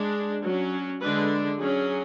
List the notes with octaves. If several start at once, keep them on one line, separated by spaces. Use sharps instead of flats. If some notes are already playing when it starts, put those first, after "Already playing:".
Already playing: G#3 D4
F#3 C#4
D3 G#3 D4 B4
F#3 C#4 G#4